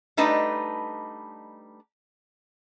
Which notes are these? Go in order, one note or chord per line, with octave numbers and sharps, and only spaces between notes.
G3 A3 D4 D#4 B4 D#5